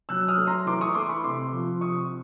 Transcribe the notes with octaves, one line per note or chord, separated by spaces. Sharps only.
F#3 E6 F#6
D#6 F6
A3
A#5 C6
E3 C6 D6
C#6 D#6
A3 C6 D6
B5 C#6
C3 C6 D6
F3
C3 C#6 D#6